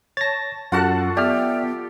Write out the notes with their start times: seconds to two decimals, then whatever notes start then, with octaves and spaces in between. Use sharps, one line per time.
0.17 C#5 A5 A6 A#6
0.72 F#2 F4 F#4 A4 F#5 A5 F#6
1.17 B3 G4 D5 E5 F6